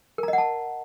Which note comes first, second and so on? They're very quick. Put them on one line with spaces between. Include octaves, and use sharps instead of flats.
A#4 A#5 D#5 F#5 A5